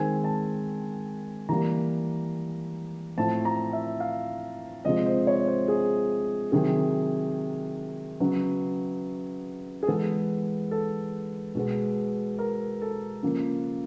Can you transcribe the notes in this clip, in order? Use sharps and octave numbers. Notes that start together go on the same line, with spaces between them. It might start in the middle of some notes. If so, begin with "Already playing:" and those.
Already playing: D#3 G#3 C4 G#5
A5
E3 G3 A#3 A#5
A2 F3 A3 C4 A5
A#5
E5
F5
C3 F3 G#3 C4 D#5
C5
C#5
C5
G#4
C3 D#3 F#3 G#4
C#3 F#3 B3
G#4
E3 G#3 B3 A4
A4
B2 G#3 B3
A#4
A4
C#3 F3 A#3